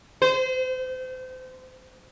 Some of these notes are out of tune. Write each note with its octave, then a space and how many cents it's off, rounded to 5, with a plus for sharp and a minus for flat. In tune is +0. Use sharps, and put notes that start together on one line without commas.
C5 -30